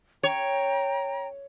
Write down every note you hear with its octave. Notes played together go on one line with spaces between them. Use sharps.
C#5 G5 A#5